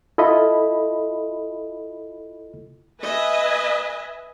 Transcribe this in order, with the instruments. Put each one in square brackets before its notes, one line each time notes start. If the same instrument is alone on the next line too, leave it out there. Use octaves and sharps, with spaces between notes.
[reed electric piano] E4 F4 A4 D#5 B5
[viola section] B4 D#5 E5 G#5